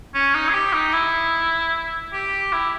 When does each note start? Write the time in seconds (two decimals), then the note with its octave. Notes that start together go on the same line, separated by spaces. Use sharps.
0.14 C#4
0.34 D#4
0.49 G#4
0.53 G4
0.73 D#4
0.93 E4
2.13 G4
2.52 E4